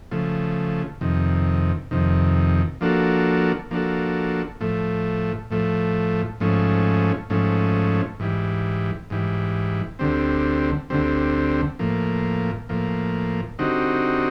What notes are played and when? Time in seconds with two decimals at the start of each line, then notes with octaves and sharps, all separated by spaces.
0.11 C#3 F3 A3
1.01 F2 C3 D#3
1.91 F2 C3 D#3
2.81 F3 A#3 D4 F#4 A4
3.71 F3 A#3 D4 F#4 A4
4.60 A2 F3 A3
5.51 A2 F3 A3
6.40 G#2 F3 A3 C#4
7.30 G#2 F3 A3 C#4
8.20 G#2 E3 G3
9.10 G#2 E3 G3
9.99 D2 D3 G3 C4
10.90 D2 D3 G3 C4
11.79 A2 F3 A#3
12.69 A2 F3 A#3
13.59 D3 G3 C4 D#4 F#4